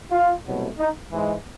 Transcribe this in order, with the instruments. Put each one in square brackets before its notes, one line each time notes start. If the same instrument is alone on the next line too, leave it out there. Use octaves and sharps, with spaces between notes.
[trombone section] F4
C2 B2 F#3 A3
D#4
G#2 E3 G#3